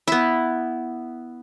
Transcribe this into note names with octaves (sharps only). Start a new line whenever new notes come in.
B3 E4